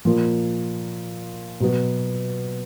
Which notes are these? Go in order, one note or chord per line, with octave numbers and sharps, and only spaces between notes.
A#2 F3 A#3 F4
B2 F#3 B3